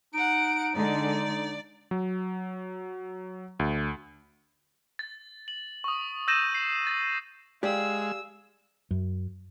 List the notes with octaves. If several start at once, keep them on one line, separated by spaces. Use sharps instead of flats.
D#4 F#5 D7
D3 G#3 D#4 D5
F#3
D2
A6
F#7
C#6 D#6
E6 G6 A6 A#6 D#7 E7
C7
A6
G#3 G4 D5 F5 E6
F#2